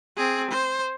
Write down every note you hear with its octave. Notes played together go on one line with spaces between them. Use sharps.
C4 G#4
C5